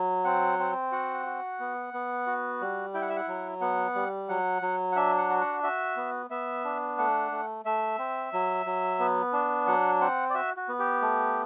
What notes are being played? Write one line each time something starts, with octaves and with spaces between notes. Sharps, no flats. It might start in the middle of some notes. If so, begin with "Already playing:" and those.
Already playing: F#3
C4 F#5
C4
F#4 F#5
F#4
B3
B3
F#4
G3
E4 G5
F#5
E5
F#5
F#3
B3 F#5
G3
F#3 F#5
F#3
F#5
D4 E5
F#5
F#4
F#5
F#4 E5
B3
B3 E5
D4
A3 F#5
A3
A3 E5
C4
F#3
F#3
B3
D4
F#3 F#5
C4 F#5
D5
F#4 E5
F#4
B3
G4
A3